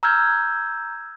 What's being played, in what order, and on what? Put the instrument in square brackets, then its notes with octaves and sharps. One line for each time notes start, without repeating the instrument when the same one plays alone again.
[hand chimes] A#5 E6 F6 G6 G#6